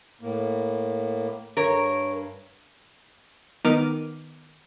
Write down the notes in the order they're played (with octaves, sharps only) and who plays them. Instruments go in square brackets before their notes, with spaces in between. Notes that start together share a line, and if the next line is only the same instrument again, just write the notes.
[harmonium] A2 A#3
[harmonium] G2 [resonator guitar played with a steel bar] A#4 C#5
[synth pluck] D#3 B3 A#4 D6 F6 D#7